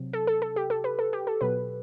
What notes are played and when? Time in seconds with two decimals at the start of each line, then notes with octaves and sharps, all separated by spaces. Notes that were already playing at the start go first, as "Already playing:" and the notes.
Already playing: C3 F#3
0.13 A4
0.27 A4
0.42 A4
0.56 G4
0.70 A4
0.84 B4
0.99 A4
1.13 G4
1.27 A4
1.41 B2 F#3 B4